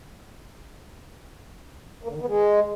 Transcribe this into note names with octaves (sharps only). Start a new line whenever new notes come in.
A#3
D3
D#3
B3
G#3